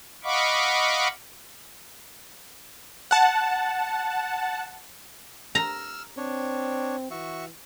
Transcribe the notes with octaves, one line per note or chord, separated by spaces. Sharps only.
D#5 F5 F#5 B5 C#6 D6
F#5 A5
A#5 E6 F6
C4 D4 C#5
E3 F#4 E5 C#6